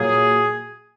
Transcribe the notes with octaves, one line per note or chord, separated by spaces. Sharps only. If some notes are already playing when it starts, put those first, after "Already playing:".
Already playing: A#2 F#3 A#3 G#4